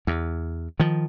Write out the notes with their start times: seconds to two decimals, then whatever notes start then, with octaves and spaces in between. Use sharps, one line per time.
0.07 E2
0.80 D#3 F3